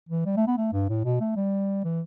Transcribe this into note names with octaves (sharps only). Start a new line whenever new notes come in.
E3
G3
A3
B3
A3
G2
A2
B2
A3
G3
E3